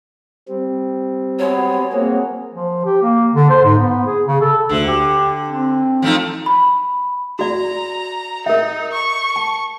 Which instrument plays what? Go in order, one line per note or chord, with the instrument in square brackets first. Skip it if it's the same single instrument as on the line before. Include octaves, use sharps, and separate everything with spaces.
[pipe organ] G3 C4
[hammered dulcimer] F#3 G#3 B3 [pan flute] C#5
[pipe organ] A#3 C4 G#4 [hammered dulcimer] F#4
[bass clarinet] F3
G4
A#3
D3
C5
G#2
B3
G#4
C#3
A4
[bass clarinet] D2 [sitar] D3
[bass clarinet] G4
C4
[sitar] F3 A3 D#4
[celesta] B5
[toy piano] F#4 D5 [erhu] A#5
[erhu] D#4 [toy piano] A#4 E5
[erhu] C#6
[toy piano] A5